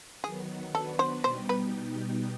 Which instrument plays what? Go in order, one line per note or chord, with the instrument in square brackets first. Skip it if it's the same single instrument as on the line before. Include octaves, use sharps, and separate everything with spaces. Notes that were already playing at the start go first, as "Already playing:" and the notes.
[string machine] D#3 F#3 B3 [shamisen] G#4
[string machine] B3 D4 F#4 B4 [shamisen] A4
[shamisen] C5
[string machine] B2 G3 B3 D#4 G4 [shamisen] C5
[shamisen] B4